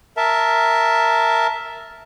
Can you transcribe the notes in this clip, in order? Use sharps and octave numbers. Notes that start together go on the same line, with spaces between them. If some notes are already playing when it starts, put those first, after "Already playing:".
A#4 E5 A5